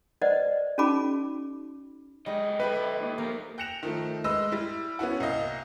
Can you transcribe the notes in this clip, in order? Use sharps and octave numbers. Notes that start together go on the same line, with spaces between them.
B4 C5 D5 D#5 F#5
C#4 D#4 F#4 G#4 B5 D6
D3 G3 G#3 D#5
E4 G4 A4 B4
G4 D5
D#2
F3 A#3 G4 A#4
G5 F#6 A#6 C#7 E7 F7
D#3 F3 A3
G#3 B4 D#5 E6
G3 E4
B3 C#4 E4 F#4
C2 A#3 D#5 F5